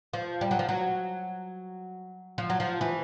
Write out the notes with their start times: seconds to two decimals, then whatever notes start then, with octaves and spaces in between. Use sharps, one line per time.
0.13 F3
0.41 G3
0.51 F#3
0.59 F3
0.69 F#3
2.38 F3
2.50 F#3
2.60 F3
2.81 E3